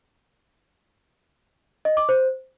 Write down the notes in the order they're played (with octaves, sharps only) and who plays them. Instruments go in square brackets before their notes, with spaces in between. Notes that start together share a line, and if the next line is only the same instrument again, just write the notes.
[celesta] D#5
D6
C5